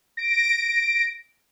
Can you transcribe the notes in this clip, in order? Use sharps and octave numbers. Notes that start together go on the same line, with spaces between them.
A#6 D7